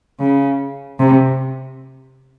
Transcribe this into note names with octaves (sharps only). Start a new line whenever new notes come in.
C#3
C3